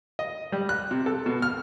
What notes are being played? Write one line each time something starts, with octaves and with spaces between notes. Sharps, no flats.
D#5
G3
F#6
C3
A4
B2
F6